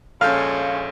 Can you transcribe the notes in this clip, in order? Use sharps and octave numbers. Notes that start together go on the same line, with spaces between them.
A#1 G#3 C#4 A4 F5 F6 G6